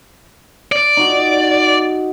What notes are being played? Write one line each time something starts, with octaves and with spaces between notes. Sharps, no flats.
D5
D#4 F#4